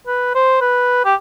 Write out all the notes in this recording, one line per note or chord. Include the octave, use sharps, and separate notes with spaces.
B4
C5
B4
G4